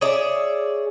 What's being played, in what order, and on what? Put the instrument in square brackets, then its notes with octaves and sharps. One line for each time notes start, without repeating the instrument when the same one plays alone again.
[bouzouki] G#4 C#5 D5 E5